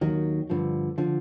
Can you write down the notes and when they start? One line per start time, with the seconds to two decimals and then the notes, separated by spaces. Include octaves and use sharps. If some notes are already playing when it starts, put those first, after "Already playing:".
0.01 D#2 D#3 F#3
0.50 G2 D3 F3
0.98 D3 F3